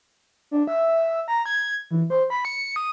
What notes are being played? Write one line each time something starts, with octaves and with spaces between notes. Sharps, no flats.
D4
E5
A#5
G#6
E3
C5
B5
C#7
D#6